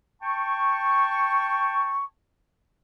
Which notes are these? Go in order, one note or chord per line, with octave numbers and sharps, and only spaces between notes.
G5 A5 C#6